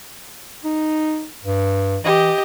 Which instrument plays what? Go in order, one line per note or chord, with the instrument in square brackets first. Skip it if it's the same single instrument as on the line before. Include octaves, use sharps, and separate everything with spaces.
[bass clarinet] D#4
G2
[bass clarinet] E3 [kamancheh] G4 D#5